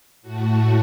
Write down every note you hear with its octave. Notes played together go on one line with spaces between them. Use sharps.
A2 A3 F#4